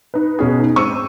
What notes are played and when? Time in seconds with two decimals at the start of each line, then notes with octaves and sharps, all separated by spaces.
0.14 D#4 B4
0.39 B2 C#4 G#4
0.60 D#4
0.76 G#2 C4 C#6 E6 D#7